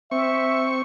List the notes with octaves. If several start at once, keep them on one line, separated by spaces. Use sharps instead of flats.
C4 E5 C#6